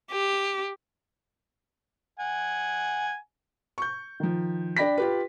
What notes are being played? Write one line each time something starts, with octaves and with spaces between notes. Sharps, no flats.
G4
F#5 G#5
C#6 G6
D#3 F3
D4 D5 G5 B5 A#6 B6
F4 G4 B4